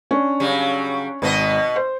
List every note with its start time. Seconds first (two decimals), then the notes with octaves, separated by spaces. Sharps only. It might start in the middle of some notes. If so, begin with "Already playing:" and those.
0.11 C#4 D4
0.40 C#3 F#3 G3
1.22 G#1 B2 B3 D#5
1.76 C5